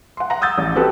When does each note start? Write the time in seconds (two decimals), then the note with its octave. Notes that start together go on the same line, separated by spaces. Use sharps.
0.17 F#5 C6
0.30 F#5 A#5
0.42 D#6 E6 G6 A6
0.58 A1
0.75 C4 F#4 G4 A4 B4